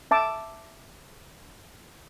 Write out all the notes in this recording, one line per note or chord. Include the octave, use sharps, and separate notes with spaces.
E5 A5 D6